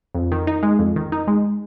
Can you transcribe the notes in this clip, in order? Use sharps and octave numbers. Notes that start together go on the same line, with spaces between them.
F2
D#3
D#4
G#3
F2
D#3
D#4
G#3